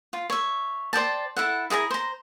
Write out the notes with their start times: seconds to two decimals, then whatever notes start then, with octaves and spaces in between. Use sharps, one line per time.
0.13 F4
0.30 C#5 E5
0.93 C5 D5 G5 A5
1.37 E4 A4 F#5
1.70 E4 G#4 F#5 A#5
1.91 C5 A#5